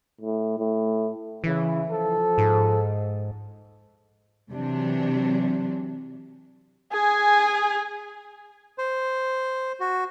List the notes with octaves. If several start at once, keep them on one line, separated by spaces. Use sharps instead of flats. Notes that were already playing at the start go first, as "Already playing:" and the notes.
A2
A2
C#3 E3 E4
F3 A4
G#2
C3 E3 F#3 D4
G#4 G#5
C5
F#4